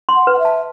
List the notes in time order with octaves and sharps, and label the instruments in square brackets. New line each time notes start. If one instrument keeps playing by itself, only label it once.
[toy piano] C6
[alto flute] F#5
[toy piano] B4
[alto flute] F#5
E5
[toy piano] A5